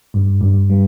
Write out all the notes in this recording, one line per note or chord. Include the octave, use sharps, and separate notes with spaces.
G2
G2
G3